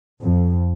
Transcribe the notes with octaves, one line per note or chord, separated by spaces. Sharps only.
F2